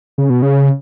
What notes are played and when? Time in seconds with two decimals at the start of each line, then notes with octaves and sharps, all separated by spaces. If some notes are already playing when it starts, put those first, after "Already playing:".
0.18 C#3
0.30 B2
0.42 C#3